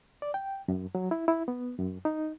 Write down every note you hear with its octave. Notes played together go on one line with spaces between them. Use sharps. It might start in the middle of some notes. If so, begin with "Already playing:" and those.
D5
G5
F#2
F#3
E4
E4
B3
F#2
D#4